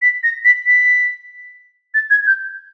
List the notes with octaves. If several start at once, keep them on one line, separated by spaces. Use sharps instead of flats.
B6
A#6
B6
B6
A6
G#6
G6